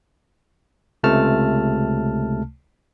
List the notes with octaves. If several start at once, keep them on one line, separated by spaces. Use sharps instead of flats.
C#2 C3 A3 A5 F6